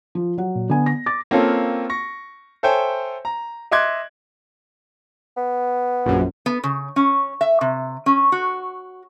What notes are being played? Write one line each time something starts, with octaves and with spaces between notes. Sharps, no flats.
F3
F#3 F#5
A#2
D3 B3 G#5
A#6
D6 A6
A#3 C4 C#4 F4 A4
C#6 A#6
A4 C5 C#5 E5 G5 G#5
A#5
D#5 E5 C6 D6 F#6 G#6
B3
A#1 F#2
B3
C#3
C#4
E5
C3
C#4
F#4